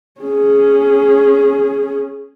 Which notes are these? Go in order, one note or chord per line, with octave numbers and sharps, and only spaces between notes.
C#4 G#4